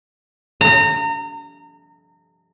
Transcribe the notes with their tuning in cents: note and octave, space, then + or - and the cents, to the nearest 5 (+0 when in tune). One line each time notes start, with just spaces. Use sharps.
A#5 -30